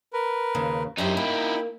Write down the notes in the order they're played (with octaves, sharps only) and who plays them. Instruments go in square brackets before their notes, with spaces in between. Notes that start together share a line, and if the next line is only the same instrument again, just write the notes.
[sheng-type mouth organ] A#4 B4
[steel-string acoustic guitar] D#2 C#3
[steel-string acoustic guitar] F#2 G4 C5 [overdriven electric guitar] D#4 E4
[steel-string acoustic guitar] A#3 [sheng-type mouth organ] G5 B5